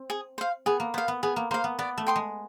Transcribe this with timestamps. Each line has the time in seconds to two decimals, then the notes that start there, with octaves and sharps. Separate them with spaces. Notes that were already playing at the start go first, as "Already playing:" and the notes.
Already playing: C4
0.10 G#4
0.38 C5 F5
0.66 B3 G#4
0.80 A#3
0.94 B3 C5 F5
1.08 B3
1.23 B3 G#4
1.36 A#3
1.51 A#3 C5 F5
1.64 B3
1.79 B3 D5
1.98 A3
2.07 G5 C6 D#6
2.16 G#3